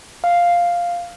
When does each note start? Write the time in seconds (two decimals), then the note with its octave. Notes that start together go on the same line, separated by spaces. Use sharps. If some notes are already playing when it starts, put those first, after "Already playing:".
0.24 F5